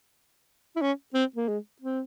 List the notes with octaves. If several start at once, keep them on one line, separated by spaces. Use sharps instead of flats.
E4
C#4
C4
A#3
G#3
C4